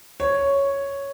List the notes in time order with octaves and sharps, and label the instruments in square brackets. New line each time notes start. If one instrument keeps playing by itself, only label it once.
[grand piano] C#5